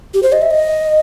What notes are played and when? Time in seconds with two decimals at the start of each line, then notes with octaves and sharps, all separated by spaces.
0.14 G4
0.23 C5
0.32 D#5
0.42 E5
0.51 D#5